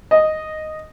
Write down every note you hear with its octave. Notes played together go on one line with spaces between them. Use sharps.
D#5